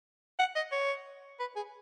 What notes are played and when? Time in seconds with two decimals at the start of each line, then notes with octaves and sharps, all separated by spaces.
0.39 F#5
0.56 D#5
0.72 C#5
1.40 B4
1.56 G#4